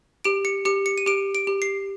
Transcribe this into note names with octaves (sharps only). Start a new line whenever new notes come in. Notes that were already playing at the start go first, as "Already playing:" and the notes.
G4 D7
C#7
G4 C#7
C#7
D#7
G4 D7
D7
G4
C7